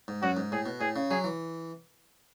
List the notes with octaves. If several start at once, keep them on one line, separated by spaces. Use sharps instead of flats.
G#2
F#2 F#4
G#2
A2 G#4
B2
A2 G#4
C#3
F#3 G#4
E3